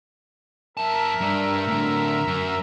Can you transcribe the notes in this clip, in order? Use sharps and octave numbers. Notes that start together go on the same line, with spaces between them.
F#2 A#4 E5 A5
G2 D4
A2 D3
F#2